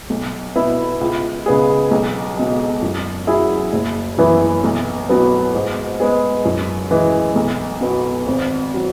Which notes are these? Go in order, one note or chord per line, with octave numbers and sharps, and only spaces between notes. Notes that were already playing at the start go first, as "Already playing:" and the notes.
B1
B2 B3 E4
C#2
C#3 G#3 B3 G#4
B1
B2 G#3
F#2
F#3 E4 G#4
F#1
F#2 E3 B3 E4
B1
B2 F#3 B3
G#2
G#3 B3 G#4
F#2
E3 G#3
B1
B2 B3 F#4
G#1
F#3